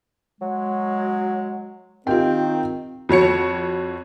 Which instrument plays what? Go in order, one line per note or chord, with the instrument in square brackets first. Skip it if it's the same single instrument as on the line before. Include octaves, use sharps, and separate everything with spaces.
[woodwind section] F#3 G#3
[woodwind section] D#3 C4 [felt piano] F4 G4 G5
[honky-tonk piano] F2 F#4 C#5 C#7